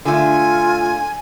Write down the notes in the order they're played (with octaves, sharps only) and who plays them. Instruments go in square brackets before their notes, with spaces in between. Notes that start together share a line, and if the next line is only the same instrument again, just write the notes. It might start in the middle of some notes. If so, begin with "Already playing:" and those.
[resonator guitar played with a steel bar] D3 A3 [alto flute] F4 [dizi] G#5